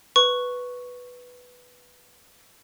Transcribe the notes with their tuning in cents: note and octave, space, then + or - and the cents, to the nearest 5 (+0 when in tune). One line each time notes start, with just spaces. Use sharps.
B4 +0 C#6 +0